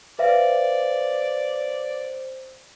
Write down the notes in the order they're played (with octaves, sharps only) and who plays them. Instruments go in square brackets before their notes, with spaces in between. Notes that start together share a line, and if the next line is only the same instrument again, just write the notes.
[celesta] B4 E5 F5 [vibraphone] C5 [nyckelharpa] D5